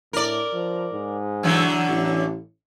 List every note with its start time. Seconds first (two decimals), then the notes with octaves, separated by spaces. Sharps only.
0.13 A2 A#4 D5
0.53 F3
0.93 G#2
1.43 D3 E3 F#3
1.88 A1